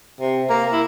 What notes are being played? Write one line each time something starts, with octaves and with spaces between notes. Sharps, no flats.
C3
A#3
E4